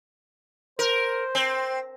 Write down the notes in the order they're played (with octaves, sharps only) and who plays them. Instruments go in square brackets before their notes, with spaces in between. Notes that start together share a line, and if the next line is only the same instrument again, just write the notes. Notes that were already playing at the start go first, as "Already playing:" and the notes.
[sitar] A#4 [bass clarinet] C5
[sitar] C4